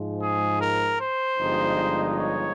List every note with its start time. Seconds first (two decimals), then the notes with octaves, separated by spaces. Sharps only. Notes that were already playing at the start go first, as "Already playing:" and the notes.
Already playing: G#2 F3 G#3
0.20 G#4
0.59 A#4
0.99 C5
1.38 G1 G2 F3 G#3 D#4
2.17 C#5